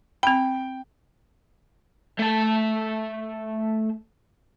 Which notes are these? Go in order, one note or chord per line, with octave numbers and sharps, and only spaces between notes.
C4 G5 B5
A3 A5